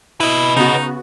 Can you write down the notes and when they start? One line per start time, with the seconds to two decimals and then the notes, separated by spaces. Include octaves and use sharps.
0.21 E4 B4 D#5
0.57 C#3 B3 D#4 F#4